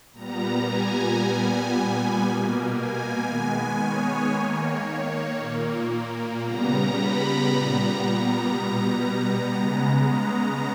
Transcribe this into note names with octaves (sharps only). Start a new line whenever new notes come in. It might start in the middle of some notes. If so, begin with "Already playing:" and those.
A#2 G3 B3 A#5
G#5
A#2 G3 B3
B2 A#3
G#5
D#3 G#3 B3
C#5
D#3 A#3 C#5
A#2 A#3
C#3 G3 B3 A#5
B5
A#2 G3 B3 A#5
A#5
B2 G3 B3 A#5
C#3 G#3 B3
A#5